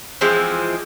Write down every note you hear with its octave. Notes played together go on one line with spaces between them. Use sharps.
E3 F3 G#3 C4